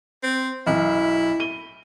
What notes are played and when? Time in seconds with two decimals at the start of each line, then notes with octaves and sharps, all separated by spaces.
0.23 C4
0.67 B1 F#2 E4
1.40 D#7 G7